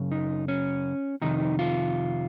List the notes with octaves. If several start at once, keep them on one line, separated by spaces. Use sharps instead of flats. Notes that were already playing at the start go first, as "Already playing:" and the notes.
Already playing: F#2 C#3
D#4
C#4
F2 C3 D#3 D#4
F4